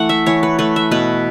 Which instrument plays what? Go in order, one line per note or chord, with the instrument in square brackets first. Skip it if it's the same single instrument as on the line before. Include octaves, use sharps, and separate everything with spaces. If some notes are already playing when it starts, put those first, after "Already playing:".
Already playing: [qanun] E3 A3 F#5
E5
E3 C#5
B4
A3 B4
E5
B2 B4